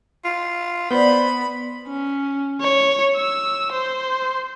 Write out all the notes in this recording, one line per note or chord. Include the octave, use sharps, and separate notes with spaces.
F4
B3 C5 D5 B5
C#4
C#5
E6
C5